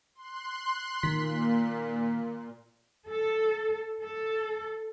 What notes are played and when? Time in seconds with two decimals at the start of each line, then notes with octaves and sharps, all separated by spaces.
0.15 C6 F#6
1.03 A#2 D#3 B6
3.09 A4
4.02 A4